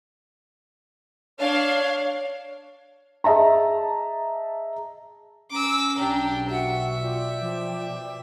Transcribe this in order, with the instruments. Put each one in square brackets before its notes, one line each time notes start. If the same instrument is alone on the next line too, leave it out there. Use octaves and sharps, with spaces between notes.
[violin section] D4 F5 [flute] C#5
[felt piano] G#4 D#5 E5 A5 A#5
[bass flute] C#4 [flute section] A#5 [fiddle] D6 E6
[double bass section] B1 [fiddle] D4 G4
[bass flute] F#4 [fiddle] E5 [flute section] F#5
[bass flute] F4 [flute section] D5 G5 D6
[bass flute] F3
[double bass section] B2